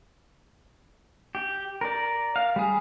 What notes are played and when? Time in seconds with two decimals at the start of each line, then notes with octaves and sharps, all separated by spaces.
1.35 G4
1.81 A#4 D5
2.36 F5
2.56 G3 G#4